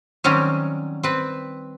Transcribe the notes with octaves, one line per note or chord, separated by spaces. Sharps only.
D#3 F#3 G3 C4 C#4
C4 B4